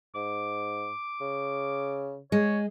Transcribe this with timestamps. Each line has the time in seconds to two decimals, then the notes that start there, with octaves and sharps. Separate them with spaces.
0.15 G#2 D6
1.21 C#3
2.32 G#3 C#5